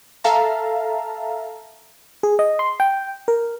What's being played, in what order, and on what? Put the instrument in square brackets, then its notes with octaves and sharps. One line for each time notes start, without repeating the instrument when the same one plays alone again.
[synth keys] A4 E5 F5 A5 A#5
[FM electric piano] G#4
D#5
C6
G5
A#4